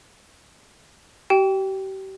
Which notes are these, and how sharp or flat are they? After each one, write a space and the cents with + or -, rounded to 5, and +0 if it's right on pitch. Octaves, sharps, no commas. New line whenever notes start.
G4 -35 G5 +0